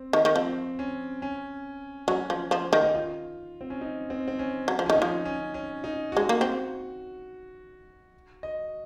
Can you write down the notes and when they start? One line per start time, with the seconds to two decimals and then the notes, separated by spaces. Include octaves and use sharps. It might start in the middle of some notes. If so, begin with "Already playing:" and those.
Already playing: C4
0.13 D#3
0.25 D#3
0.35 F3 C4
0.79 C#4
1.22 C#4
2.08 F#3 C#4
2.30 F3
2.51 F3
2.73 D#3
2.83 D#4
2.94 F4
3.61 C4
3.70 C#4
3.81 D#4
4.10 C4
4.28 C4
4.39 C#4
4.68 F#3
4.79 F3
4.86 D#3 C#4
4.96 D#4
5.02 F3
5.25 C#4
5.54 C#4
5.84 D#4
6.12 G#3 F#4
6.29 A#3
6.41 C4
8.43 D#5